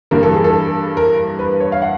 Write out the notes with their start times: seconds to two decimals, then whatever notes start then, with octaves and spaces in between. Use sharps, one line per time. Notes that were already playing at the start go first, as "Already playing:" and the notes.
0.11 G2 E3 G3 A#3 A#4
0.23 A4
0.33 G#4
0.44 A4
0.97 A#4
1.39 B4
1.60 C#5
1.72 F5
1.82 F#5